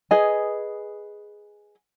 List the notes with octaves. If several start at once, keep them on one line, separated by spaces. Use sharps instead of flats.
G#4 B4 D#5 G#5